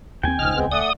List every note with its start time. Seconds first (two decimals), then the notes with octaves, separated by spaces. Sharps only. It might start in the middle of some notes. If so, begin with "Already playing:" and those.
0.23 D#2 C4 G5 G#5
0.39 D#1 C#2 G#2 D#5 F6
0.55 G#3 B3 C4
0.72 A3 D5 F#5 D#6